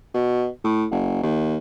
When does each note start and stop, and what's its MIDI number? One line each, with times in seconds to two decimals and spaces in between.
0.14 0.47 47
0.64 0.85 45
0.91 1.21 30
1.23 1.58 39